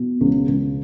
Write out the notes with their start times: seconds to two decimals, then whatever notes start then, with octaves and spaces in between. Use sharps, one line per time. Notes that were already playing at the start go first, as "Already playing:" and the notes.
Already playing: B2
0.21 C#2
0.48 C#2